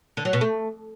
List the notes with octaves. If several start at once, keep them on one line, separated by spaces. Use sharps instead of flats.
D3
F#3
B2
A3